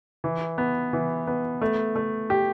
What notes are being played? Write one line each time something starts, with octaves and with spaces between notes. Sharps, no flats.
E3
B3
E3
B3
A3
A3
G4